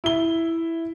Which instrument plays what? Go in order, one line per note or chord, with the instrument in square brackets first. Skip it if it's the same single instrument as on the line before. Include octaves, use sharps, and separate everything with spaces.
[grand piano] E4 G7